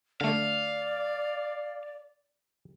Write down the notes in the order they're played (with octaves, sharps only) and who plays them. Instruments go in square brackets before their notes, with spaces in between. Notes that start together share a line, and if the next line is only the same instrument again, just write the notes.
[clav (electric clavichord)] D3 A3 [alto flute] D5 [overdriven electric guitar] F5